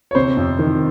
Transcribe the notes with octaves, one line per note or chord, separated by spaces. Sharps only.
C#5
C3 C5
F2
D#3